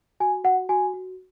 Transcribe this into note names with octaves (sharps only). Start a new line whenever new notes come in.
F#4 G#5
F#4 F#5
F#4 G#5
F#4